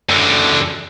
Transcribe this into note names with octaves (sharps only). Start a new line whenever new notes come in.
F#2 D3